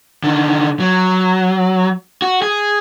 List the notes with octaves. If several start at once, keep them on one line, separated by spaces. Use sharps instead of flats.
D3 D#3
F#3
F#4
G#4